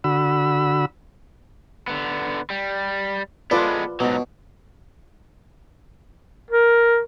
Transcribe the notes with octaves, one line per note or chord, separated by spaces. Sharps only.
D3 F#4 B5 E6
D3 B3
G3
G#3 B3 F4 A4 B4 D5
G#2 B2 F#3
A#4